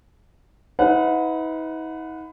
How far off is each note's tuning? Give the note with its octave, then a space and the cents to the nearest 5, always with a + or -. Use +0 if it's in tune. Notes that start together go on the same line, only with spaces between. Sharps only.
D#4 +45 B4 +25 F#5 -35